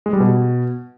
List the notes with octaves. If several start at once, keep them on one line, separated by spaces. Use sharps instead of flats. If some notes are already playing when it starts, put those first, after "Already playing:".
G#3
G3
B2